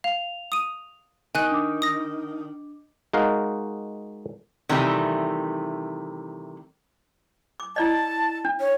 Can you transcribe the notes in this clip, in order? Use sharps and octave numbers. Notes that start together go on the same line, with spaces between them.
F5 F7
D#6 D#7
D#3 G#5 F#6 D#7
D4 D6
D#6 A#6
G#3 D#4 F#4 A#4 F5
C3 D#3 E3 G3 A3
D6
E4 D5 D#5 A5
D4
C#5